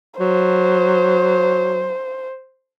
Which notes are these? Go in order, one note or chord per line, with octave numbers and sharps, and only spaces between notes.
F#3 C5